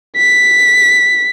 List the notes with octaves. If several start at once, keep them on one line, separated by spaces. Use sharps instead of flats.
B6